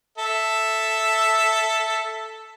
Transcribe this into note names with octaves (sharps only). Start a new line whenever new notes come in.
A4 E5